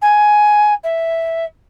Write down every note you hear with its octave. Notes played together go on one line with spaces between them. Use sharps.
G#5
E5